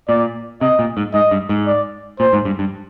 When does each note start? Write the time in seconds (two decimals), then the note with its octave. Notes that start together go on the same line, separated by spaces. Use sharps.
0.09 A#2 D5
0.61 C3 D#5
0.79 A#2
0.97 G#2
1.14 G#2 D#5
1.31 G2
1.49 G#2
1.67 D5
2.19 A#2 C5
2.33 G#2
2.45 G2
2.59 G2